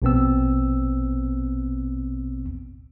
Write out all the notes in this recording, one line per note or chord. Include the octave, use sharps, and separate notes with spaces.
A#1 B2 B3 C4 E6